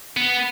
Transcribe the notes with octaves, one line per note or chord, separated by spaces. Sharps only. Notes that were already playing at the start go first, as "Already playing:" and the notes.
B3